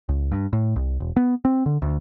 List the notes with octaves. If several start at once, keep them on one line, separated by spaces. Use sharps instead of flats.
C#2
G2
A2
C2
E1
B3
C4
D3
D2